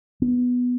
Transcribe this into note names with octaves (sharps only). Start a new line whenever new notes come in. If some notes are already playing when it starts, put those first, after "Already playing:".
B3